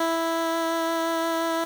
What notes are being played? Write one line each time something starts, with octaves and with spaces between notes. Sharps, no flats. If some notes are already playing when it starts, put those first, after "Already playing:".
Already playing: E4